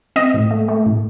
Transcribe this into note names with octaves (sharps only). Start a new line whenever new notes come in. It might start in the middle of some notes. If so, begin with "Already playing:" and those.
C4 D#5
A2
A3
A3
A2